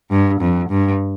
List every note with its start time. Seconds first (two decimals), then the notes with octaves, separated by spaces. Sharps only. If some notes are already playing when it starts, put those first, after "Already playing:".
0.10 G2
0.40 F2
0.69 G2